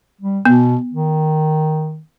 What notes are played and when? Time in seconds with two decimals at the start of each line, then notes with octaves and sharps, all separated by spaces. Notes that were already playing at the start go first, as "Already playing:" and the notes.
0.22 G3
0.45 B2 B3
0.93 D#3